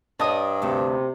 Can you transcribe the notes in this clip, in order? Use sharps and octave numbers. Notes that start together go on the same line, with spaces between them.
G2 D4 C#5 D#5 D#6
D2 C3 A3 F#4